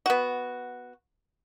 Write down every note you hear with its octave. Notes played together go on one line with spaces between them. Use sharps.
B3 F#4